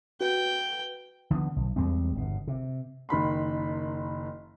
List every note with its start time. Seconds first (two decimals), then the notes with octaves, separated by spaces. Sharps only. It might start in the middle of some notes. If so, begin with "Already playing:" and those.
0.21 F#4 B4 G5
1.31 D3 F3 G#3 B3
1.56 B1
1.76 E2 G3 G#3 C4
2.15 G1 B2
2.48 C3
3.09 F#1 D#3 B5 C6